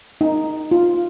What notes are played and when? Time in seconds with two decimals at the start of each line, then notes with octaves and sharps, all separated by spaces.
0.21 D#4
0.71 F4